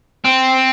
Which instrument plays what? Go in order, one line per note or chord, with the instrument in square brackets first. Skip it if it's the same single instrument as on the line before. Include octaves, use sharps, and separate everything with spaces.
[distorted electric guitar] C4